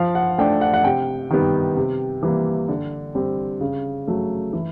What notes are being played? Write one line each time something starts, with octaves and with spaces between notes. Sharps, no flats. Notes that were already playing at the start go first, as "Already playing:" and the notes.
Already playing: F3 F5
F#5
A3 D4 G5
F#5
F#5
C3 G5
D#3 G3 B3
C3
E3 G3 A#3
D3
G3 C4
C#3
F#3 A3
E3